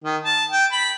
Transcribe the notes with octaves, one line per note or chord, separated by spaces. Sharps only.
D#3
A5
G5
B5